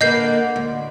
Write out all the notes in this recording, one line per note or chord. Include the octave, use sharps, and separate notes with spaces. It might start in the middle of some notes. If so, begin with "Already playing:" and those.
D3 A#3 B4 D#5 G6 C7
D2